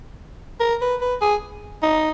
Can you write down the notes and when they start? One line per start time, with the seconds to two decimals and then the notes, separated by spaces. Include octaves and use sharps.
0.60 A#4
0.81 B4
1.01 B4
1.21 G#4
1.82 D#4